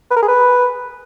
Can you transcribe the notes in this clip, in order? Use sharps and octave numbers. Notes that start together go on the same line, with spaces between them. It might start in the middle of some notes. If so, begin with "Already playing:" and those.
B4
A#4
G#4
B4